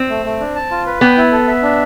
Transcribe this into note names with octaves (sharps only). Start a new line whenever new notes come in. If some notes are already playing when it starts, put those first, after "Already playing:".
Already playing: C4
A3
A3
D4
A5
F4
B4
B3 G5
E4
A4
E5
D4